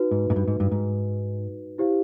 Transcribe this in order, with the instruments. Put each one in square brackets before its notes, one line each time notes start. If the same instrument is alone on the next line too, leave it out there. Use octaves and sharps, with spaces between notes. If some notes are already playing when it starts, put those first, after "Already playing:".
Already playing: [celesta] D#4 F#4 B4
[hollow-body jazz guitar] G#2
G#2
G2
G#2
G2
G#2
[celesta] E4 G4 C5 F5